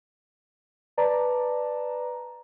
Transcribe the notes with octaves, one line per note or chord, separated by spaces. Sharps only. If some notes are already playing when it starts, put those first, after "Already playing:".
B4 D5 A5 A#5